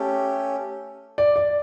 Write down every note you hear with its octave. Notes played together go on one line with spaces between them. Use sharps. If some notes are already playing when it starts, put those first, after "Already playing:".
Already playing: A3 C#4 G4
D5
D5